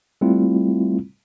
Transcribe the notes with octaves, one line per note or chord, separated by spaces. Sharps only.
G3 A3 C4 E4 F4